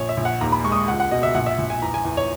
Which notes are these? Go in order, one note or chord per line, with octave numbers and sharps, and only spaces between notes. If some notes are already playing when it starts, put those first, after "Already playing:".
Already playing: A#1 C#5
E5
A#1
F#5
D#2 A#5
B5
G#3 C#6
D#6
C#6
C#2 F#5
F#5
B2 D#5
E5
A#1 F#5
E5
A#1
G#5
E2 A#5
G#5
E2
C#5